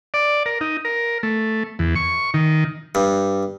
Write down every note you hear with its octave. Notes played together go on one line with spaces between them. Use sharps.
D5
A#4
D#4
A#4
A3
E2
C#6
D#3
G2